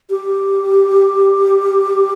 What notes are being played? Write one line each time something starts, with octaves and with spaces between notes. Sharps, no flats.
G4